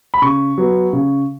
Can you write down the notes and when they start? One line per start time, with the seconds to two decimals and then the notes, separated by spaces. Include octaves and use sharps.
0.14 B5
0.22 C#3 C#6
0.58 F#3 B3
0.93 C#3